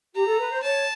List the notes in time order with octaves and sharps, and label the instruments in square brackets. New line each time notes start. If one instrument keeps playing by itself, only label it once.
[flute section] G4 [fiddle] A#5
[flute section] A4
B4
C5
[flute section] C#5 [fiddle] A5